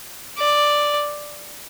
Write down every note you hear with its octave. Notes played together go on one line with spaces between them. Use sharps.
D5